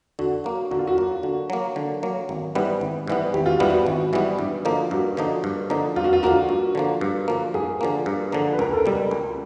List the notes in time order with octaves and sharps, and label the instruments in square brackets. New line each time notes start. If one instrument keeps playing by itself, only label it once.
[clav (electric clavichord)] D3 [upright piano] F#4
[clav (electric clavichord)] F#3 A#3
[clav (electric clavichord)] D3 [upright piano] F#4
[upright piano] F4
F#4
[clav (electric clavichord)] F#3 A#3
D3
F#3 A#3
D3
F#3 A#3
G#1
G#2 E3 G3 B3
G#1
G#2 E3 G3 B3
[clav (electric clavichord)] G#1 [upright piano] G4
[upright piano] F4
F#4
[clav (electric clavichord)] G#2 E3 G3 B3
[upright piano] F#4
[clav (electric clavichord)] G#1
G#2 E3 G3 B3
G2
D3 F3 A#3 D#4
[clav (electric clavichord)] G2 [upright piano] F#4
[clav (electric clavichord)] D3 F3 A#3 D#4
G2
D3 F3 A#3 D#4
[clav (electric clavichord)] G2 [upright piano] F4
[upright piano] F#4
F4
[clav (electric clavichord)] D3 F3 A#3 D#4 [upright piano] F#4
[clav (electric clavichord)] G2
D3 F3 A#3
G2
D3 F3 A#3
[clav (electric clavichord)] G2 [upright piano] G#4
[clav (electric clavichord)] D3 F3 A#3
G2
D3 F3 A#3
[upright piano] B4
[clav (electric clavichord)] C#2 [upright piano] A#4
[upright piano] A4
A#4
[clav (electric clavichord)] B2 G3
C#2